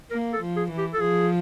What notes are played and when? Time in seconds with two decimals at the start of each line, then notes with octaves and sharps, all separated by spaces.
0.10 A#3 A#4
0.33 A4
0.41 F3
0.56 G#4
0.71 E3
0.78 G4
0.94 A4
1.00 F3 G#4